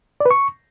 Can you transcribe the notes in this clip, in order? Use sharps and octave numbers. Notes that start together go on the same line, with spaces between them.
D5
B4
C#6